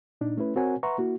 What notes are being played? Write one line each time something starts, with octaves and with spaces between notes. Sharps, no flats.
A#2 D4 D#4
A3 C#4 E4 B4
C4 F#4 A#4 C#5 F#5 G#5
B4 E5 F#5 A#5 C6 C#6
A#3 E4 F#4